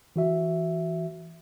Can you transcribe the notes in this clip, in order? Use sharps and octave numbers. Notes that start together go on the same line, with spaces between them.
E3 F#4 E5